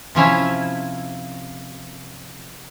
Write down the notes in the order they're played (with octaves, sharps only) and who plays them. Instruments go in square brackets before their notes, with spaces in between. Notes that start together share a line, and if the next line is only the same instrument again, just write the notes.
[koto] C3 F3 C#4 E4